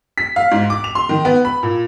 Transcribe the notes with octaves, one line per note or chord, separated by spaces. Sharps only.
B6
F5
G#2
D6
F7
C6
D#3
B3
B5
A#2